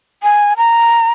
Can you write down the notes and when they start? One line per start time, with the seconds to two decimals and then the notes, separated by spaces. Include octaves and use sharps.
0.23 G#5
0.57 A#5